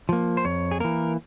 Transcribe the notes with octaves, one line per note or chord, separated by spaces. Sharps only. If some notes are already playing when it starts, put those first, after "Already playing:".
F3 A#3
C5
F2 C#5
G#4
E3 A#3 A#4